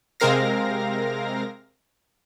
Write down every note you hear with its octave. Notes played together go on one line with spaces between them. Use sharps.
C3 G#3 C4 A#4 F5 A#6